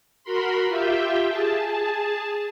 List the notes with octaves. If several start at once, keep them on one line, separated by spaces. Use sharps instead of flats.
F#4 A#4 B5 C6
F4 G4 E5 G5
G#4 A5